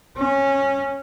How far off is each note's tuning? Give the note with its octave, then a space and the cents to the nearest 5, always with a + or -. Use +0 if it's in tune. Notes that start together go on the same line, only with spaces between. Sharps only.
C#4 -15